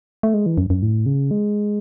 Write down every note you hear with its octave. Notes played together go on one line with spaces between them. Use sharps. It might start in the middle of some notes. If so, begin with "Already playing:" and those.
A3
G#3
E3
F#2
F#2
A2
C#3
G#3